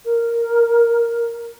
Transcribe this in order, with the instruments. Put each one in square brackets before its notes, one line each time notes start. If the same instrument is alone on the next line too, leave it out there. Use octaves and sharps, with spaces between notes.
[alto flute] A#4